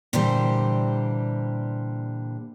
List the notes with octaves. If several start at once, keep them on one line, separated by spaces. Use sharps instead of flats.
A#2 D3 E3 G3 G4 C5